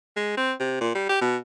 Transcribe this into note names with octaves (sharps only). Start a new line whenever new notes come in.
G#3
C4
C3
A#2
G3
G4
B2